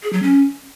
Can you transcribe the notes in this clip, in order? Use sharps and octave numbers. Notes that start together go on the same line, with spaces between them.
G#4
F#3
C#4